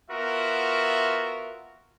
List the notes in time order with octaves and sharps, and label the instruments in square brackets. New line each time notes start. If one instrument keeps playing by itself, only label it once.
[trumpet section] B3 F4 F#4 A#4 E5